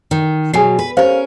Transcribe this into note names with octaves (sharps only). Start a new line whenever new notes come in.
D#3
B2 F#3 G#4 G#5 C7
B4
C#4 G4 A#4 C5 F5